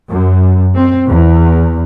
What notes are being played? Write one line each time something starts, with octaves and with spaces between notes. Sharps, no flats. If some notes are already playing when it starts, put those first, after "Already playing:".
F#2
C4
E2